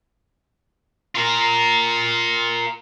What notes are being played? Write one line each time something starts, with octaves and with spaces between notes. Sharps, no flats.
F4 A#4